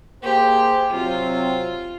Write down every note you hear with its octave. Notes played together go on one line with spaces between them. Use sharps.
A#3 G4 G#4 C5
C3 F#3 C4 F4